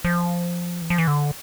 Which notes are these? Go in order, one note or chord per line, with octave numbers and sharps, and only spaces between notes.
F3
E3
F3
E3
D3